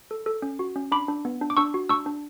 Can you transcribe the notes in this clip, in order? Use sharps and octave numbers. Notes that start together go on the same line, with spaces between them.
A4
A4
C#4
F#4
C#4
D4 B5 D6
D4
B3
D4
D6
D4 C#6 E6
F#4
D4 C#6 E6
D4